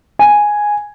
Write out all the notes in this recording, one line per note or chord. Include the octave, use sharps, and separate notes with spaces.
G#5